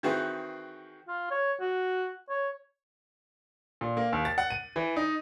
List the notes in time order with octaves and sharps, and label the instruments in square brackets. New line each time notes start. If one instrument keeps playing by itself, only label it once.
[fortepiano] D#3 E3 C4 F#4 G#4 B4
[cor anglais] F4
C#5
F#4
C#5
[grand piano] A#2
A#3
D#2
A6
F#5
D#7
E3
D#4